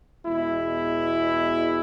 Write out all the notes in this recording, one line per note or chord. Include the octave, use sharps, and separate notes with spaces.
E2 B2 G#3 E4